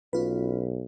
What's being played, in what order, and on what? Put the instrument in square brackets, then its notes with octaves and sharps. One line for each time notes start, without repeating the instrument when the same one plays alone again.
[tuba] B1 [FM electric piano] C#4 F4 B4